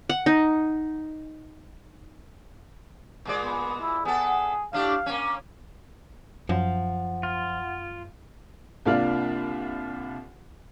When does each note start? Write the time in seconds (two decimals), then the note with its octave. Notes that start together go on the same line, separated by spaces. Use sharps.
0.09 F#5
0.26 D#4
3.25 A#2 G#3 D5
3.45 B3
3.81 E4
4.05 B3 G#4 A4
4.73 A2 D4 G4 F5
5.06 A#3 C#4
6.49 F#2 F3 F#5
7.23 F4
8.86 C2 A#3 D4 F4 D5 F6